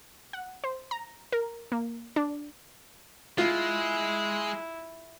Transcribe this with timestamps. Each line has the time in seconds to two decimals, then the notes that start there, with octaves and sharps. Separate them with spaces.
0.33 F#5
0.64 C5
0.91 A#5
1.32 A#4
1.72 A#3
2.16 D4
3.38 G#3 E4 F4